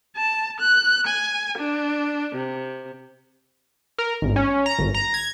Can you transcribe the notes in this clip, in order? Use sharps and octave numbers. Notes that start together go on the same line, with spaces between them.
A5
F#6
G#5
D4
C3
A#4
G#1
C#4
A#5
G#1
A#5
G#6